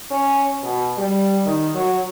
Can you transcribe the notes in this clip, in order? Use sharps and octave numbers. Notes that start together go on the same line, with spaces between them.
C#4
B2
G3
D#3
F#3